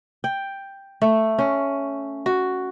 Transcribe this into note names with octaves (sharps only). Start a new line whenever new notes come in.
G5
A3
C#4
F#4